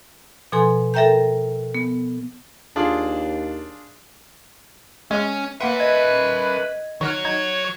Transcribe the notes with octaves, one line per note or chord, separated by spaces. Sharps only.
B2 F3 A4 G#5 C6
A4 A#4 E5 G5 A#5 G6
B3
D#2 D4 F4 G#4
G#3 C#4 D#5
A#3 A#4 B4 E5 F#5 C6
D#5 G#6
D#3 F#3 F#4 C#5 F6
D#4 G#6